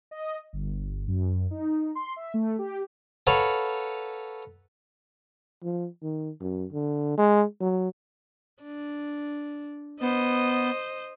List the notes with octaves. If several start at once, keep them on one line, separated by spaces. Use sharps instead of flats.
D#5
G1
F#2
D#4
C6
E5
A3
G4
A4 B4 C#5 F5 F#5 A#5
F3
D#3
F#2
D3
G#3
F#3
D4
B3 C5 D#5